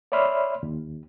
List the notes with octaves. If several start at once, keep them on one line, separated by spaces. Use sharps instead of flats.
C#5 D5 E5 B5 C6 F6
D#2